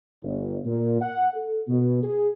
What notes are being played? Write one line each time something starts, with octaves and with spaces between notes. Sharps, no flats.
G1
A#2
F#5
A4
B2
G#4